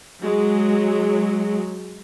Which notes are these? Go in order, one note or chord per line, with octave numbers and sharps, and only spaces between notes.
F#3 G#3